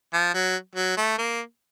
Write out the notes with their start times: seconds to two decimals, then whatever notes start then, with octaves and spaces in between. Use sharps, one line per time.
0.13 F3
0.34 F#3
0.76 F#3
0.98 A3
1.19 A#3